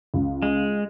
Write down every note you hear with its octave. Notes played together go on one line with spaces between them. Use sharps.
C#2
G#3